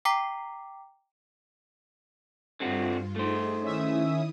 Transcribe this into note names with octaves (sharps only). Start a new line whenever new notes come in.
G5 A#5 D6 B6 C7
G2 D3 C4 F4 F#4
A3 D#4 G#4 C5
D#3 C#4 E4 E5 D#6